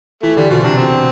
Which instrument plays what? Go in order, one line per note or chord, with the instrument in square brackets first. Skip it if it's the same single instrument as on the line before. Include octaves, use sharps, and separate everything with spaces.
[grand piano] E3 [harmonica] A3
[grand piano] D3 [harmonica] G3
[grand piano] B2 [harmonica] F3
[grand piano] C3 [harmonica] D4
[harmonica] C4